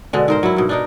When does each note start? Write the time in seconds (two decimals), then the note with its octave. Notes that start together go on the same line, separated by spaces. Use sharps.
0.13 B2 D3 G#3
0.28 G#2 A#4 C5
0.43 F#3 E4
0.57 G2 B2
0.69 D4 D#4 A#4